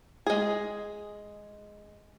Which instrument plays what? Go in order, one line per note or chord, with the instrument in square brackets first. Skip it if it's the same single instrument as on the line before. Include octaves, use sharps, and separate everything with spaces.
[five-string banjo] G#3 G#4